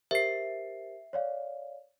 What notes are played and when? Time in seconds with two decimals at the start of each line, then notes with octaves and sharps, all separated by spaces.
0.11 G4 A#4 C5 E5 C7
1.13 C#5 D5 F5